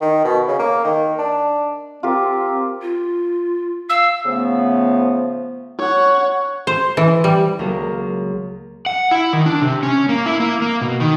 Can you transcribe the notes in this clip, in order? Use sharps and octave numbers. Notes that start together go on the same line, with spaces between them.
D#3
B2
C#3
A#3
D#3
D4
C4 F4 G4 A#4
F4
F5 E6
C#3 F3 A3 B3
C#5 F#5
C5
E3
G3
C#2 F#3 A#3 A#4
F#5
E4
D#3
D4
C3
C#4
A#3
E4
A#3
A#3
B2
D#3